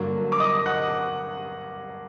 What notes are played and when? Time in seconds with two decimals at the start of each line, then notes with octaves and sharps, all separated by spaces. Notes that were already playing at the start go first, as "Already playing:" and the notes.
Already playing: G2 D3 F#3 A#3
0.32 D6
0.40 D#5 D#6
0.66 F#5 F#6